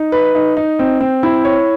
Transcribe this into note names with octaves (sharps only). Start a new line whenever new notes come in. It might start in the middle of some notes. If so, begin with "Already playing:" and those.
Already playing: D#4
B4
D#4
D#4
C4
C4
E4
C#5